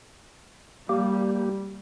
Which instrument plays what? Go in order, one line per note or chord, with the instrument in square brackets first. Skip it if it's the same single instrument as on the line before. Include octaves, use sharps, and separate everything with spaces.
[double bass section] G3 [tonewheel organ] A#3 G4